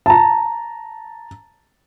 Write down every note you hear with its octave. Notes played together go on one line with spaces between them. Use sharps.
A5 A#5